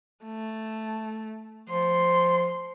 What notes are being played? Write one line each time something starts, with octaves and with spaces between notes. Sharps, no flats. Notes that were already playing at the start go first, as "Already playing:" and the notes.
A3
F3 C6